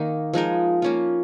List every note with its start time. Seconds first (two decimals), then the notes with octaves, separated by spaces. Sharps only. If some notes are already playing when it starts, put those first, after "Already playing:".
Already playing: D#3 A#3 D#4
0.33 F3 G#3 D#4 A#4
0.82 A#3 C#4 F4